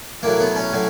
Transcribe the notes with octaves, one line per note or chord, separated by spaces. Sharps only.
A2 F#3 A#3
B3
C#4
A2 F#3